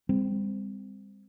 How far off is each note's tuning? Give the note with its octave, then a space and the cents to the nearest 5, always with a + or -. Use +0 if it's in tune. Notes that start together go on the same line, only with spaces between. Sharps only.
G3 +40 C4 -10